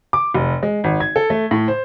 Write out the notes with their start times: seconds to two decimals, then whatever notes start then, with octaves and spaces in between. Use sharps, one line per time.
0.13 D6
0.34 F1
0.63 G#3
0.84 G#1
1.00 G#6
1.16 A4
1.30 A3
1.51 A2
1.68 C5